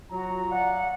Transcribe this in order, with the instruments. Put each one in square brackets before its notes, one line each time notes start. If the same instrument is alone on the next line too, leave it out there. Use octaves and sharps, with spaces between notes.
[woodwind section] F#3 F4 F#4 [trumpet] A#5
[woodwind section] D5 F5 F#5